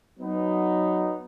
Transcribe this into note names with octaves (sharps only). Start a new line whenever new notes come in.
F#3 B3 D#4